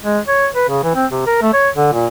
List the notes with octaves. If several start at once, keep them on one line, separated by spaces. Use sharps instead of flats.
G#3
C#5
B4
C#3
E3
C4
C3
A#4
A3
C#5
D3
A#2